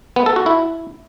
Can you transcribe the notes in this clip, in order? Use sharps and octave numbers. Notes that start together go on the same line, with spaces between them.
B3
A4
F#4
E4